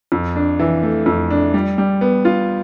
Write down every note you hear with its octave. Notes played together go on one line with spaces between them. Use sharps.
F2
D4
E3
A3
F2
D4
G3
G3
B3
F4